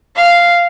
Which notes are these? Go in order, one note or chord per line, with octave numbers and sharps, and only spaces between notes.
F5